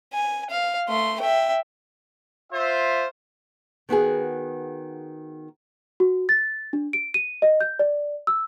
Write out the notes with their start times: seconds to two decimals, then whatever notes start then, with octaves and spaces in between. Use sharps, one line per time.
0.14 G#5
0.50 F5
0.88 A3 C6
1.20 E5 G5
2.52 F4 C5 E5
3.89 D#3 B3 F#4 G#4
6.00 F#4
6.29 A6
6.73 D4
6.93 D7
7.14 D#7
7.42 D#5
7.61 G6
7.79 D5
8.27 E6